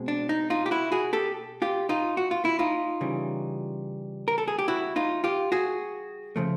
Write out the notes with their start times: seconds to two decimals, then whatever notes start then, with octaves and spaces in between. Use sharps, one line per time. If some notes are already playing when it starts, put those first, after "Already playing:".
Already playing: B2 G#3 C4
0.08 D4
0.29 D#4
0.50 D#4 F4
0.66 G4
0.71 E4 F#4
0.92 F#4 G#4
1.13 G4 A4
1.62 F4 G4
1.89 D#4 F4
2.17 F#4
2.31 F4
2.45 E4
2.59 D#4 F4
3.01 C#3 E3 G3
4.28 A#4
4.38 A4
4.48 G#4
4.59 G4
4.68 E4 F#4
4.96 D#4 F4
5.24 F4 G4
5.52 F#4 G#4
6.36 C#3 F3 A3